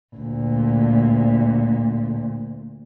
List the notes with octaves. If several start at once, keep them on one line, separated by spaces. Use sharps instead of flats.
D2 A#2